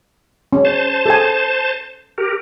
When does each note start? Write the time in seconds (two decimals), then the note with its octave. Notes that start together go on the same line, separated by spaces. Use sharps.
0.53 C#4
0.65 C5 A5
1.06 A4 G#5
2.18 G4 A#4